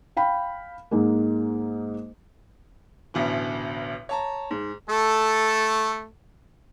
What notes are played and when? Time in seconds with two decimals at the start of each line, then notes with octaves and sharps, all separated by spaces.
0.17 F5 G5 B5
0.91 G#2 G#3 A#3
3.14 A1 D2 B2
4.09 C#5 A5 A#5
4.51 G#2
4.90 A3 A4